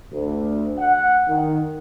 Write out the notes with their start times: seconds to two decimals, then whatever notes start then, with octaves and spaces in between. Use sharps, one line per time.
0.12 D2
0.78 F#5
1.28 D#3